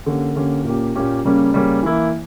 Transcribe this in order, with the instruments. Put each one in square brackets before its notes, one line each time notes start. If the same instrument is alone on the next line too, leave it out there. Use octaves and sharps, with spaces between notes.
[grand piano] D3 A#3 C#4 G4
D3 A#3 C#4 G4
A#2 A#3 C#4 G4
A#2 A#3 C#4 G4
C#3 G3 A#3 C#4
C#3 G3 A#3 C#4
E3 A#3 E4